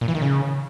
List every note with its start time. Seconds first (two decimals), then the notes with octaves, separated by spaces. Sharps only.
0.01 A#2
0.08 E3
0.15 D#3
0.21 C#3